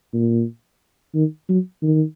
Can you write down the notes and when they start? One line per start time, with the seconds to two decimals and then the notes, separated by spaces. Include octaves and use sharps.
0.14 A#2
1.15 D#3
1.49 F#3
1.82 D#3